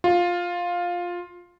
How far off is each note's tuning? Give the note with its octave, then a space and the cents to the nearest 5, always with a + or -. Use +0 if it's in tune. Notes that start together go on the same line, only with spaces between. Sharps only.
F4 +10